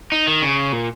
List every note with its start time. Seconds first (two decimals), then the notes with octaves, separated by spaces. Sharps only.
0.12 D#4
0.27 D#3
0.42 C#3
0.72 A#2